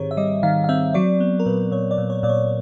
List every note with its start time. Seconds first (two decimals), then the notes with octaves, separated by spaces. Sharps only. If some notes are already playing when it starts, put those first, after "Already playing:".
Already playing: G#2 D#3 C4 G4 G#4 C5 C#5
0.11 E5
0.17 G3 D#5
0.43 D#3 F5
0.64 F5
0.69 C4 E5
0.94 F#3 D5
1.20 B3
1.40 A#4
1.46 A#2 B4
1.72 A#2 C#5
1.91 D5
1.98 A#2
2.10 C#5
2.23 A#2 D5
2.29 C#5